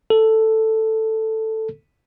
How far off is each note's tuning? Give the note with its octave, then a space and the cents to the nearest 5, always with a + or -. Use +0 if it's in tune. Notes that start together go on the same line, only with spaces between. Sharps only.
A4 +5